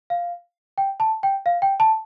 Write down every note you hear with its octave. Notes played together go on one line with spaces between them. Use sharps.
F5
G5
A5
G5
F5
G5
A5